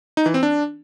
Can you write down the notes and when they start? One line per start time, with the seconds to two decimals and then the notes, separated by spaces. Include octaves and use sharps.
0.17 D#4
0.26 E3
0.34 C4
0.43 D4